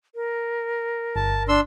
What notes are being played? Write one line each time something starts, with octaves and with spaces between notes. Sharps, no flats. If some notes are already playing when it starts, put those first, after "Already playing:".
A#4
G1 A5
D4 C6 E6